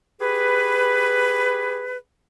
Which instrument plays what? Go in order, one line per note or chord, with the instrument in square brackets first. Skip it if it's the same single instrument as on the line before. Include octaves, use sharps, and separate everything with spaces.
[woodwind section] G4 G#4 B4